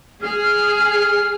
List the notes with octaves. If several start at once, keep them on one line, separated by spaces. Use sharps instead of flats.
G#4 F6